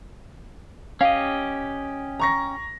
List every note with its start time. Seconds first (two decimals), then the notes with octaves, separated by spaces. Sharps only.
1.01 C#4 G4 D#5 F5
2.20 A#5 C#6 A#6